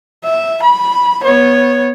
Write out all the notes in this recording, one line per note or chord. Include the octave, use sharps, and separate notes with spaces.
E5
B5
B3 C#5